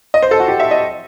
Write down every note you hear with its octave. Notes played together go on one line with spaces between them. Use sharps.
D#5
C5
A4
F#4
G4
E5
D#5